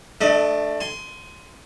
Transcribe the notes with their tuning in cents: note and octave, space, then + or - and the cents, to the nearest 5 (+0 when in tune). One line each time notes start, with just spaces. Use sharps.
A3 +0 D4 +20 D#5 +45
G#5 +20 C6 -10